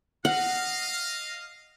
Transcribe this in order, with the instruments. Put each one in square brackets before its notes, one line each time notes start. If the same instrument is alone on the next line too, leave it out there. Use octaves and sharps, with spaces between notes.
[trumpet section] D#5 F5 [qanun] F#5